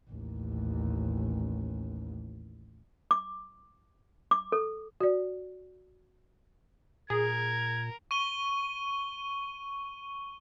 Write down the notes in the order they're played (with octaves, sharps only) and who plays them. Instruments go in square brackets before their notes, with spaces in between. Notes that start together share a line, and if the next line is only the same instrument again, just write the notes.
[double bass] A1 D#2
[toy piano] D6
D6
A4
[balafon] F#4 D5
[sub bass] A#2 [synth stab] G#4 [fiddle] A#4 [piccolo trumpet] G#6
[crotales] C#6 D#7 G7